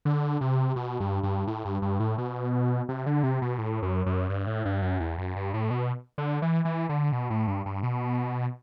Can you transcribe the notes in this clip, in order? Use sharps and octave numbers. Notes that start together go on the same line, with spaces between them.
D3
C3
B2
G2
G2
A2
G2
G2
A2
B2
C3
D3
C3
B2
A2
F#2
F#2
G2
A2
G2
F#2
E2
F#2
G2
A2
B2
D3
E3
E3
D3
B2
A2
G2
G2
B2